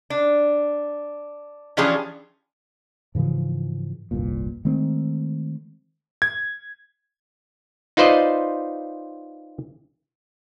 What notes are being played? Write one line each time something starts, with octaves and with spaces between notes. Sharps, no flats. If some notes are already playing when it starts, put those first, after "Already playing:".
D4
E3 F3 C#4 D4 G4 G#4
G#2 C#3 E3 F3
F1 C2 G2 A#2
D#3 G#3 A3 C4
G#6
D#4 F4 B4 C5 D5 D#5